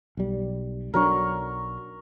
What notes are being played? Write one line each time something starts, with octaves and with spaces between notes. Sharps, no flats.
B1 G3
B1 F#3 D4 A#4 C#6